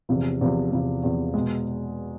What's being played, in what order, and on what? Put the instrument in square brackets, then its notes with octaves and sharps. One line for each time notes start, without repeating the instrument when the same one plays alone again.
[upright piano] E2 C3 F3
E2 C3 F3
E2 C3 F3
E2 C3 F3
B2 G#3